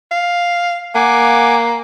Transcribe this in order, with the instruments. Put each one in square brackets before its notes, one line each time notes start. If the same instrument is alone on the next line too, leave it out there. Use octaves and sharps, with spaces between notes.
[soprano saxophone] F5
[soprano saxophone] A#3 [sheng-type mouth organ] F#5 G#5 D6